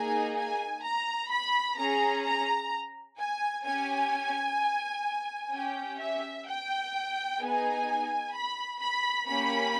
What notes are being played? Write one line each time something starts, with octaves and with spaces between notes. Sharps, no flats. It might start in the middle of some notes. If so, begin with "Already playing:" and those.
Already playing: A#3 D#4 G#4 G#5
G#5
A#5
B5
C#4 G#4 A#5
A#5
G#5
C#4 G4 G#5
C#4 G4 G5
E5
G5
B3 D#4 G#4 G#5
B5
B5
A#3 C#4 G4 B5